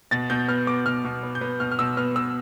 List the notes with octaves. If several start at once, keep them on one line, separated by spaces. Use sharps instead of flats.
B2 A6
B2 G6
B3 F6
B3 D6
B2 F6
B2
B3
G6
B3
B2 F6
F6
B2 E6
B3 F6
B3 E6